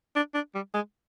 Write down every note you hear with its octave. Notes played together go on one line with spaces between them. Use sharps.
D4
D4
G3
G#3